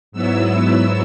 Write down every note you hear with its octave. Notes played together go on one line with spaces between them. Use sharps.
G#2 F#3 B3 E4 E6